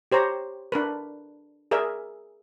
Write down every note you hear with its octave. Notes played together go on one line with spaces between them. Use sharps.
G4 C5 C#5 A#5
D4 A#4 B4
G#4 A#4 D5 E5